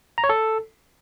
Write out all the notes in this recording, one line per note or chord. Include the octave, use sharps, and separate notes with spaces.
A#5
C#5
A4